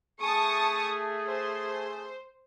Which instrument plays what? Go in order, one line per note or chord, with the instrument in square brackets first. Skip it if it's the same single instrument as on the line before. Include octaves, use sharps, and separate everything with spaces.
[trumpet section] A3 G#4 [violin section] A5 C#6 D#6
[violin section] C5